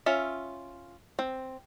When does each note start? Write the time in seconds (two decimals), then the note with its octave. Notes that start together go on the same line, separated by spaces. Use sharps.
0.06 C#4 F4 E5
1.19 C4